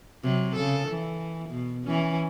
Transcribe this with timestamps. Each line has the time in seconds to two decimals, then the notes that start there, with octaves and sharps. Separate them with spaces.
0.23 C3 F#3
0.55 C#3 A4
0.88 E3
1.49 B2
1.85 E3 C#4